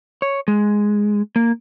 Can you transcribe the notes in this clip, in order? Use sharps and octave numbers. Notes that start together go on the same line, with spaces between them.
C#5
G#3
A#3